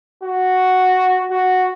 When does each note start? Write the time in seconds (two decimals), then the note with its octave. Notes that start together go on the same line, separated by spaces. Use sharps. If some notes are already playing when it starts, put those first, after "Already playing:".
0.24 F#4
1.31 F#4